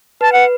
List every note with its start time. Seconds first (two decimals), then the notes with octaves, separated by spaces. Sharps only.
0.21 B4 A5
0.33 B4 F#5